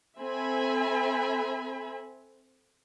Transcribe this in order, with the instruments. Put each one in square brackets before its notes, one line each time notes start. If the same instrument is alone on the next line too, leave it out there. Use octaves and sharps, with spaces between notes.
[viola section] C4 A4 E5 G#5 B5